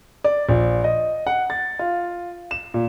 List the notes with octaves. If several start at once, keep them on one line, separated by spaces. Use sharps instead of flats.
D5
A#1
D#5
F#5
A6
F4
E7
A#2